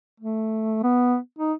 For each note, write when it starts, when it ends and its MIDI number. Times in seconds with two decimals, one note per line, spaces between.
0.20 0.83 57
0.83 1.17 59
1.39 1.53 63